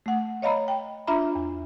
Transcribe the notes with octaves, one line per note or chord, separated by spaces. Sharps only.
A3 F#5
C#5 D#5 F5 A#5 B5
G5
D4 F4 E5 A#5 B5
E2